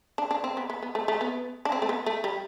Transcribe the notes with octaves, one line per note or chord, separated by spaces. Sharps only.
D4
D4
C4
B3
B3
B3
A3
A3
B3
D4
C4
A3
B3
A3
G3